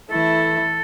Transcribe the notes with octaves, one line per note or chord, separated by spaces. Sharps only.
E3 A3 E4 A4